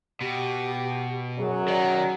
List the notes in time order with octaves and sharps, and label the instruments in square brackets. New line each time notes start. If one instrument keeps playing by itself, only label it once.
[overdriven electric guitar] B2 [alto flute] G4
[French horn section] F#2 F#3 [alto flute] G#4
[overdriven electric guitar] D#3 [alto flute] D5